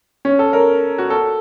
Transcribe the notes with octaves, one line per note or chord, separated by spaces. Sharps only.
C#4
A4
A#4
F#4
A4